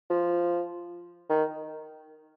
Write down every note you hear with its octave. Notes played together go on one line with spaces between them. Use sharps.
F3
D#3